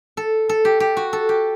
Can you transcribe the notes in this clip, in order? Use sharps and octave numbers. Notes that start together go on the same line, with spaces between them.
A4
A4
G4
G4
F#4
A4
G4